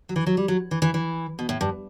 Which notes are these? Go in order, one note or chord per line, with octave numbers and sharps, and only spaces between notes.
F#3
E3
F#3
G3
F#3
E3
E3
E3
B2
A2
G2